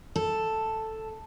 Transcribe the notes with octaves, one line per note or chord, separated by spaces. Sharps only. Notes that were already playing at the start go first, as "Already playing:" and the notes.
A4